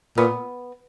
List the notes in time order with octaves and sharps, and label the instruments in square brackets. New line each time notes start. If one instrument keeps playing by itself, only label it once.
[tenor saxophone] A#2 [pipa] B3